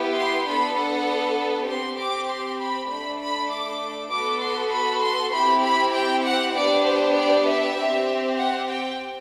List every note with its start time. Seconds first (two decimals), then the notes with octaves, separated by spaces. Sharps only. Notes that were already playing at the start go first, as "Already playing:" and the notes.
Already playing: B3 E4 G4
0.15 C6
0.46 B3 D4 A4 B5
0.77 F#5
1.68 C4 G4 C6
1.98 D6
2.29 C6
2.60 B5
2.90 A3 D4 A4 B5
3.21 B5
3.51 D6
4.12 B3 F#4 A4 D6
4.42 C6
4.72 B5
5.03 C6
5.33 C4 E4 G4 B5
5.64 B5
5.94 G5
6.25 F#5
6.56 B3 D4 G4 D5
6.86 C5
7.17 D5
7.47 E5
7.78 C4 G4
8.39 F#5
8.69 G5